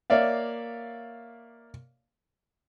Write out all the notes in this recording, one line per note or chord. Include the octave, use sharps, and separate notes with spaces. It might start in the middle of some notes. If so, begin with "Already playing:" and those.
A#3 C#5 D5 E5 F5